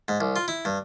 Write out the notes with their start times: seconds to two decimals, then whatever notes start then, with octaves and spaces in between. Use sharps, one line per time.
0.08 G#2
0.20 C2
0.36 F4
0.48 E4
0.65 G2